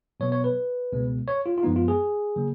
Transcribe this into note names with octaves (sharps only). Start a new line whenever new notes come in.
B2 F#3 B3 C#5
C#5
B4
C#2 B2 G#3 B3
C#5
F4
F4
F#2 F3 G#3 B3 D#4
F4
G#4
C#3 F#3 A#3